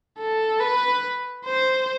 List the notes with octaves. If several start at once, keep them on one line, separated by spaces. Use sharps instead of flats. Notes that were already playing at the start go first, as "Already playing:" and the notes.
A4
B4
C5